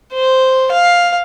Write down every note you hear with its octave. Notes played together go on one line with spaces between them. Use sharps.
C5
F5